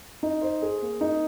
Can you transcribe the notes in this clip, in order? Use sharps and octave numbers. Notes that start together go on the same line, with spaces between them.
D#4
C5
G#4
A#3
D#4